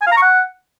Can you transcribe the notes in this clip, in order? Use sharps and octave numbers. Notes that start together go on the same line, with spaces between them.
G#5
F5
A#5
C#6
F#5